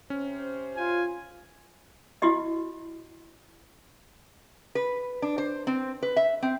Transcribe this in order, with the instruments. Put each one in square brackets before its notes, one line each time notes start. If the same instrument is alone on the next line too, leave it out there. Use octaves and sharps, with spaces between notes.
[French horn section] C3 C5 [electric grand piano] C#4
[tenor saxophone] F4 [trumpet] G#5
[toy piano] E4 F#4 G4 D#5
[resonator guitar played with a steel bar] B4
D4
C5
C4
B4
E5
C4